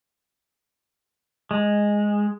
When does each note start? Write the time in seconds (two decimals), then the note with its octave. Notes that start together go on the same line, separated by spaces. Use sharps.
1.51 G#3